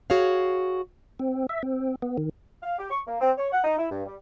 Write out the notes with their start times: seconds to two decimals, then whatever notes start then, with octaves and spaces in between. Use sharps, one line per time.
0.10 F#4 G#4 C#5 F5
1.19 C4
1.49 E5
1.63 C4
2.02 B3
2.18 D#3
2.63 F5
2.79 G4
2.91 C#6
3.07 A#3
3.21 C4
3.38 C#5
3.52 F#5
3.64 D#4
3.78 E4
3.90 G2
4.06 G3